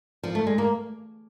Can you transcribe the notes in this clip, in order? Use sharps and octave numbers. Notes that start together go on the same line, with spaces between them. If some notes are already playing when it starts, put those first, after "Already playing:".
F3
A3
G#3
A#3